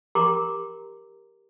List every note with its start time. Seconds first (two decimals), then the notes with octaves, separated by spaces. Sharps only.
0.15 G4 A#4 A#5 C6 D6